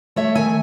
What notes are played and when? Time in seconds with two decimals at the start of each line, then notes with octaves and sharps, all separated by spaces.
0.16 A3 C#5 E5
0.35 D#3 E5 G#5